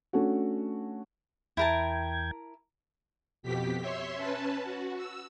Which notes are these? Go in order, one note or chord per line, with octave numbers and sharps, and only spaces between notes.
A3 C#4 D4 F#4
E2 E4 A#4 G5 A5 G#6
F2 B2 G4 B6
C#5 E5 C6
C#4 B4 A5
F#4
E6